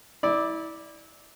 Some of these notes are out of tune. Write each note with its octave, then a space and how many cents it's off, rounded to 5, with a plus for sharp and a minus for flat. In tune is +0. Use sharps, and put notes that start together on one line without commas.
E4 -25 D5 +0